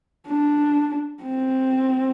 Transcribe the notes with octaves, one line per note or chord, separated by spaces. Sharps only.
D4
C4